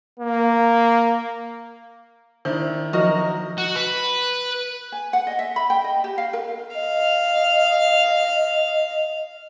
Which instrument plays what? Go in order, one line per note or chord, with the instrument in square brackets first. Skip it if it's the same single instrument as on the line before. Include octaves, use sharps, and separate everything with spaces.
[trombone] A#3
[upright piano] D#3 D4 E4 [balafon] C5
[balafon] F3 F#3 [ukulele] F#4 A#4 [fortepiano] D#5
[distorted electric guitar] F#4
B4
[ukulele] G#5
F#5
D#5
E5
B5
G5
D#5
G4
F5
A#4
[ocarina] D#5 [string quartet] F5